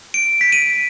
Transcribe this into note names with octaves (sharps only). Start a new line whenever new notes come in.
D7
B6
D#7